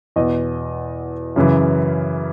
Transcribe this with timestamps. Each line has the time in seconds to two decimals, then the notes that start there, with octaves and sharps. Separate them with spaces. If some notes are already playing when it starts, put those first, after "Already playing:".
0.16 E2 B2 D#5
1.36 F#2 C#3 E3